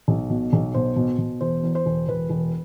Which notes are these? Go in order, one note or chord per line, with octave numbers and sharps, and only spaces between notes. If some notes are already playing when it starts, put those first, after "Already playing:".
B1
B2
B1
B2 C5
B2
B2
E1 C5
E2
C5
E1
E1 B4
E1